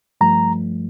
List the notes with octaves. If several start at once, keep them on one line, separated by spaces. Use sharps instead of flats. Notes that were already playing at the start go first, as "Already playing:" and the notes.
G2 F3 A3 A#5